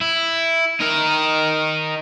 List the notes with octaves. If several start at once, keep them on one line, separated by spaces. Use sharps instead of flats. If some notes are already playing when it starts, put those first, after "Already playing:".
E4
D#4 A#4